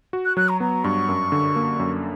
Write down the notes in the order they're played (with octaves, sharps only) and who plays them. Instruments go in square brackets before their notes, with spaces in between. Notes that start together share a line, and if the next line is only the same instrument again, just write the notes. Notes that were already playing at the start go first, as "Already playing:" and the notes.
[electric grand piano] F#4
[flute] F#6
[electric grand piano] F#3 [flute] F#6
[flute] A#5
[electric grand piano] B3 [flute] A#5
[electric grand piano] G2 [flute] C#6
[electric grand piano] F#2
D3
A#3
F#2